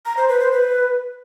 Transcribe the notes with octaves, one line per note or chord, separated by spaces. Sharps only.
A#5
C5
B4
C5
B4